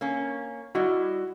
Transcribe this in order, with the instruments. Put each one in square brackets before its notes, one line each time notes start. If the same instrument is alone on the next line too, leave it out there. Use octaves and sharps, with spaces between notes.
[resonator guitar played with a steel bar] A#3 C#4
[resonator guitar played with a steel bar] G3 E4 D#5 [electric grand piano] F#4